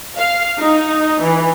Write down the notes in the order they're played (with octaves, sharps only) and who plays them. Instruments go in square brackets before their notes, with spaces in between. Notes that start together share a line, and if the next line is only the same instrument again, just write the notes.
[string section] F5
D#4
E3